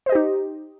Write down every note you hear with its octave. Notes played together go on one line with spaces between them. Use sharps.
D#4 G4 C5 D#5